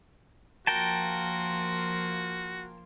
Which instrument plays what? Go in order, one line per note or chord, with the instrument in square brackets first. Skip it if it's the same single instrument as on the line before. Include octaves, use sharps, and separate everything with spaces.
[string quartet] F3 A#3 F4 [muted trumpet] F#4 [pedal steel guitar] A#4 G5 A5